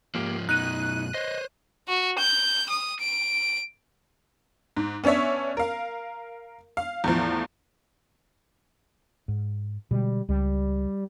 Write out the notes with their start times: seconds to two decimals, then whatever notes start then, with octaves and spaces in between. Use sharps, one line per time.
0.15 G#2 F3 A#3 G4
0.49 F#2 B2 D#4 F#6 D#7
1.14 C5 C#5 D#5
1.88 F#4
2.19 G6
2.70 D#6
3.01 D7
4.77 G#2
5.04 B3 C#4 D4 C#5 E5
5.57 A#4 F5
6.77 F5
7.04 E2 A2 F3
9.28 G#2
9.91 B2 D3 G3 G#3
10.29 C#2 G3